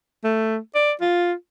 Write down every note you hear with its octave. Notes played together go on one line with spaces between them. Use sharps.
A3
D5
F4